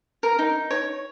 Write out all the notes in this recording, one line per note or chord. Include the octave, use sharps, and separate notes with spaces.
A#4
D#4
C#5